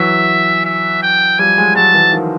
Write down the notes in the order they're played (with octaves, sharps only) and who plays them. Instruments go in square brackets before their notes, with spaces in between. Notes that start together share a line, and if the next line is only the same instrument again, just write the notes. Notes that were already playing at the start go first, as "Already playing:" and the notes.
Already playing: [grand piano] E3 F#3 [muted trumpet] E5
[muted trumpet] E5
G5
[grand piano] F3 G3 [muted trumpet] G#5
[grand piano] F#3 G#3
[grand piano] F#3 G#3 [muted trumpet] A5
[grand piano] E3 F#3
D#3 F3